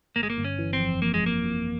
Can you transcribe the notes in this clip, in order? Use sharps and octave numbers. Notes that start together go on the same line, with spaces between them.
G1 A#3
G#3
A#3
G1
C#4
E3
C4
F2
F2 A#3
G#3
F2 A#3
F2